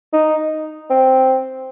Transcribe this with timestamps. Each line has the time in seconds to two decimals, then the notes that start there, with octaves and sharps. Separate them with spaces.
0.13 D#4
0.90 C4